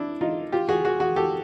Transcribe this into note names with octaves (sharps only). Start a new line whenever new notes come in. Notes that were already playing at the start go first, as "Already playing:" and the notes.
Already playing: D4 E4
D#4 F4
F4 G4
F#4 G#4
F#4 G#4
F#4 G#4
G4 A4